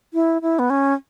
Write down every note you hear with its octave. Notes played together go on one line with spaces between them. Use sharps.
E4
E4
B3
C#4